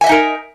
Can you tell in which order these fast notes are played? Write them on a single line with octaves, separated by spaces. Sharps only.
G#5 E5 D#5 D#4 A#4